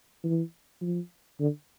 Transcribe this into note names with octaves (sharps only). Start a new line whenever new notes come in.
E3
F3
D3